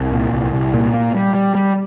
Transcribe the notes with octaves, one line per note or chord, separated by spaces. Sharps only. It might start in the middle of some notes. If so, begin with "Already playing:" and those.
Already playing: C2
A#2
C2
C2
A#2
A#3
G3
G3
G3